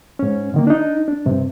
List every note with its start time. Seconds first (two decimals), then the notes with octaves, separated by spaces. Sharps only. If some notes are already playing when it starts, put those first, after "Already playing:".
0.19 G#2 C#4
0.54 D3 D#3 A#3
0.67 D4 D#4
1.08 D4
1.26 G2 C3